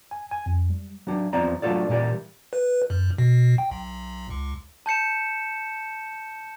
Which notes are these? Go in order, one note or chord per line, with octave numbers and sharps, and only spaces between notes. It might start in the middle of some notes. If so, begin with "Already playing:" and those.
G#5
G#5
F2
G3
F#3 D4
E2 F3 C4 D5 A#5
F#3 A3 D4 F4 A4 D5
A#2 E3 G3 A#4 D5
B4
F#2
B2
G5
B1
C#2
A5 G6 C#7 E7